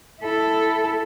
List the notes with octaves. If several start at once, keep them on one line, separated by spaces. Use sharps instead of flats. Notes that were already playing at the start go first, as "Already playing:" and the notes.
E4 A4